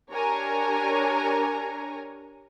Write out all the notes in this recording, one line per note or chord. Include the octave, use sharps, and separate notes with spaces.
D4 G4 A#4 C#5 G#5 A#5